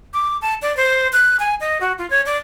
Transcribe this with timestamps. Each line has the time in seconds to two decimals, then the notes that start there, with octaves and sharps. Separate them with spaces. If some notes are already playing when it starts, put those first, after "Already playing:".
0.14 D6
0.42 A5
0.62 D5
0.77 C5
1.13 F#6
1.40 G#5
1.60 D#5
1.81 F#4
1.98 F4
2.10 C#5
2.26 D5